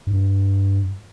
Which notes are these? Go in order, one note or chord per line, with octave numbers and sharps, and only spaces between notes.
G2